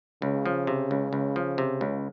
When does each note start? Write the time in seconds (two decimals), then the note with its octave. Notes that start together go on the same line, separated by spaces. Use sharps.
0.22 C#2 C#3
0.46 F3
0.67 C3
0.91 C#2
1.13 C#2
1.36 F3
1.58 C3
1.81 C#2